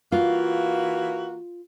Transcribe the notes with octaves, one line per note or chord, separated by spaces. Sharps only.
E3 A#3 F4 F#4